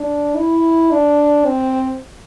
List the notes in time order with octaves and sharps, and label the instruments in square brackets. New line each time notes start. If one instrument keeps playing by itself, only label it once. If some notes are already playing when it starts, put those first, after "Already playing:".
Already playing: [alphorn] D4
E4
D4
C4